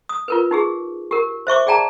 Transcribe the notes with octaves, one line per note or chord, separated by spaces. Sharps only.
D#6
F4 A#4 B4
D#4 G4 G#4
G4 A#4
C5 E5 C#6 D6
G#4 D5 G5 A5 A#5